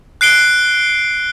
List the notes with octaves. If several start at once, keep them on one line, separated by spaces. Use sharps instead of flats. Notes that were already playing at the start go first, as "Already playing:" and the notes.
F#6 C7 D7 G7